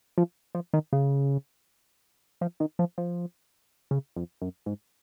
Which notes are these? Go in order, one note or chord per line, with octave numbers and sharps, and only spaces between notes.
F3
F3
D#3
C#3
F3
D#3
F3
F3
C#3
F2
F#2
G#2